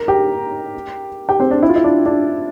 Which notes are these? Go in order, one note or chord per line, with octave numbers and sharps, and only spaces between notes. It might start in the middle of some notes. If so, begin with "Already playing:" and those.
Already playing: A#4 A#5
G4 G5
G4 G5
C4 C5
D4
E4
F4
E4
D4
D4